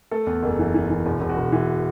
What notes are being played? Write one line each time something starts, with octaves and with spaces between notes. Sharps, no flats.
A3 A4
E2
F#1
E3
E3
E3
E1
E1
F#4
E1
E3